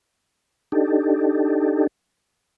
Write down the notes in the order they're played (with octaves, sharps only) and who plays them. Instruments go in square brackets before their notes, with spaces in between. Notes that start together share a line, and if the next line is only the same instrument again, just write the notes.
[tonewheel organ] D4 D#4 G4 A4